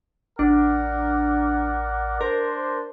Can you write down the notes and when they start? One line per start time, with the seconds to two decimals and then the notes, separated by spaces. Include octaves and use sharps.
0.39 A1 D4 A#4 D5 F#5
2.21 D4 A#4 C5